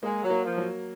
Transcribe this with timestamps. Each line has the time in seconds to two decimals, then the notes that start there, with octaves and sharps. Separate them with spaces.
0.03 G#3 A#3
0.23 F#3
0.30 A#3
0.44 F3
0.58 F#3